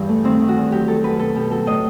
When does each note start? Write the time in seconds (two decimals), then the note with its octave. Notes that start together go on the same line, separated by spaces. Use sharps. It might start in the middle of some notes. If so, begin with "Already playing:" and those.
Already playing: E2 G2 E3
0.09 A3
0.24 D#3 C4
0.40 D#3
0.48 F#4
0.57 E2
0.72 F#3 G4
0.88 F#3 A4
1.04 F#2 B4
1.19 B2 A4
1.35 B2 G4
1.51 F#3 A4
1.67 A2 D#5